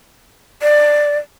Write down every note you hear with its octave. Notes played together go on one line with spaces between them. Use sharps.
D5